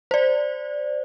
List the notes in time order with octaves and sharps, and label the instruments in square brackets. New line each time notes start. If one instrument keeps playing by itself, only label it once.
[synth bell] C5 D5